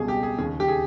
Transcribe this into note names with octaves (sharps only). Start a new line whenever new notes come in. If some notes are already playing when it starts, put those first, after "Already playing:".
Already playing: C#2 B2 G3 G#4
G4
G#4
D#2 C#3 G#3 G#4
G4
G#4